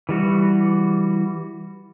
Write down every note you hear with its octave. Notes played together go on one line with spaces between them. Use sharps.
E3 G3 F#4